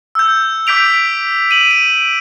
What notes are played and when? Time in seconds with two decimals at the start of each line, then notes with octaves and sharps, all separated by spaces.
0.15 E6 G6
0.67 D6 G6 B6 D7 F7
1.51 D#7 F#7
1.71 D7